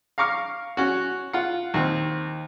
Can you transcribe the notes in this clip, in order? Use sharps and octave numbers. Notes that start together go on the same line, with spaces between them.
F5 A#5 C#6 D6 F6
C#4 F#4
F4 F#5
D#2 C4